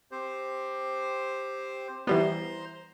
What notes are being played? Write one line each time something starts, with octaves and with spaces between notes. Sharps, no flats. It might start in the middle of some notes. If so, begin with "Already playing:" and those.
C4 G4 C5
E3 G3 B3 C5 A#5 C6